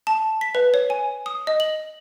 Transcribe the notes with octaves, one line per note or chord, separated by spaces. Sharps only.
A5
B6
B4
C#5
G#5
D#6
D#5
F#7